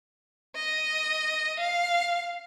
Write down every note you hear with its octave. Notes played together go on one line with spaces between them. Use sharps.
D#5
F5